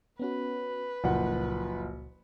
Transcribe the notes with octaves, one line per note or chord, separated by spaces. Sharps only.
B3 C#4 F#4 B4
F#1 C#2 A#2 F3 F#4 F#5